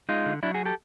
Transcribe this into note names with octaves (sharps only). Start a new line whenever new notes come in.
G#3 D#4 F4
D3
F#3 D4 E4
F#4 G#4
G4 A4